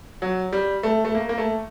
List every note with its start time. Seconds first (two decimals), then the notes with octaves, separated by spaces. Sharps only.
0.22 F#3
0.52 G3
0.83 A3
1.05 A3
1.15 A#3
1.29 A#3
1.38 A3